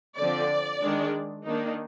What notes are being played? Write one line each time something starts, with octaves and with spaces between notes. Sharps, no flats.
D3 F3 C4 D5
D#3 G#3 D4
D#3 A#3 D4 D#4